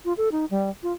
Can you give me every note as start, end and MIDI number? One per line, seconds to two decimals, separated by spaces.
0.05 0.13 65
0.17 0.29 69
0.32 0.45 63
0.51 0.70 55
0.83 0.93 65